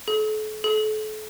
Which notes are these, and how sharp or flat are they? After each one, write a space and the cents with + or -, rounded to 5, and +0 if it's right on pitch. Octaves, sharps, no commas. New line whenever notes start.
A4 -40
A4 -35